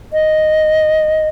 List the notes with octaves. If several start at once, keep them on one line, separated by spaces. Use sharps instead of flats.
D#5